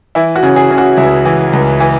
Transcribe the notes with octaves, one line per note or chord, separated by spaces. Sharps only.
E3 E4
F#4
C#3
G#4
C#3
F#4
C#2 E4
E3
C#2
E3